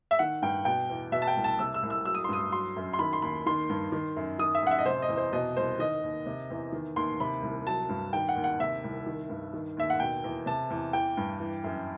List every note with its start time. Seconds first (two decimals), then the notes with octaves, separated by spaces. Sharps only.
0.11 E5
0.19 D#3 F#5
0.42 G2 G5
0.65 B2 G5
0.90 E2
1.12 B2 E5
1.22 A5
1.27 G5
1.36 C2
1.44 A5
1.59 C3 E6
1.74 E6
1.83 C2
1.90 E6
2.05 F#3 E6
2.15 D#6
2.24 C6
2.29 G2 D#6
2.52 F#3 C6
2.76 F#2
2.93 C6
2.99 D#3 B5
3.13 C6
3.22 D#2 B5
3.46 D#3 C6
3.69 G2
3.92 D#3
4.16 F#2
4.39 D#3 D#6
4.55 E5
4.63 F#2 F#5
4.71 E5
4.79 D#5
4.86 C3 C5
5.02 D#5
5.09 E2
5.17 C5
5.33 B2 D#5
5.57 C2 C5
5.79 D#3 D#5
6.03 D#2
6.26 C3
6.50 E2
6.72 D#3
6.96 D#2 C6
7.20 C3 B5
7.42 C2
7.66 F#3 A5
7.89 G2
8.13 D#3 G5
8.29 F#5
8.36 D#2
8.44 F#5
8.60 C3 E5
8.84 C2
9.06 D#3
9.30 G2
9.53 D#3
9.77 D#2 E5
9.90 F#5
10.00 B2 G5
10.24 E2
10.46 C3 A5
10.70 E2
10.93 E3 G5
11.17 G2
11.39 E3
11.64 F#2